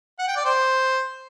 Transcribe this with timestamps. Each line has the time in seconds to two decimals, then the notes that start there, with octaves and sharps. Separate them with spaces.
0.19 F#5
0.28 G5
0.36 D5
0.45 C5